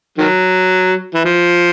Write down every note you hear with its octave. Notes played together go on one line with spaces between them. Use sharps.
D#3 F#3
E3
F3